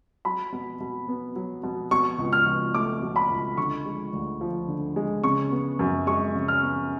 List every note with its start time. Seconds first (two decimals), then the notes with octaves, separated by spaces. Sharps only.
0.25 F#3 B5
0.53 B2
0.80 B2
1.08 B3
1.36 F#3
1.63 B2
1.91 B2 C#6
2.18 C#2
2.33 F6
2.47 C#2
2.74 A3 D6
3.02 B2
3.16 B5
3.30 C#2
3.57 D3 C#6
3.86 G#3
4.13 D2
4.41 F3
4.68 D3
4.96 G#3
5.24 C#3 C#6
5.52 B3
5.79 F#2
6.07 G#3 C#6
6.35 C#3
6.48 F6
6.62 B3